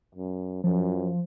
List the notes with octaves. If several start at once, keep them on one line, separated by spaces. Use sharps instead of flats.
F#2
F#2 F3